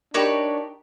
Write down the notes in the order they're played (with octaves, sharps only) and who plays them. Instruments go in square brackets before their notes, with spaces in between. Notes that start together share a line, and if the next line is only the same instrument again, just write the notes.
[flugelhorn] D4 [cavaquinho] D#4 G4 B5 [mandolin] F#4 C#5 D5 [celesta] A#4